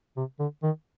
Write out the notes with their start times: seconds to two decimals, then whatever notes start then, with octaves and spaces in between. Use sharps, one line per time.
0.17 C3
0.40 D3
0.63 D#3